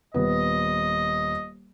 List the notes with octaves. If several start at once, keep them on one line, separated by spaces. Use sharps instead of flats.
D#1 B3 D#5